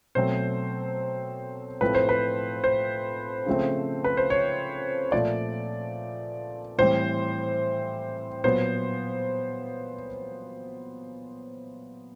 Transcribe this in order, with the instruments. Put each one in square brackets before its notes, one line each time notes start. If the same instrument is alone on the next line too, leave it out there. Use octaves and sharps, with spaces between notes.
[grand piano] B2 F#3 A3 C4 C5
A2 F3 A3 C4 B4
C5
B4
C5
C#3 F3 A3 C4
B4
C5
C#5
A#2 F3 A3 D5
A2 E3 G3 C4 C5
A#2 F#3 B3 C5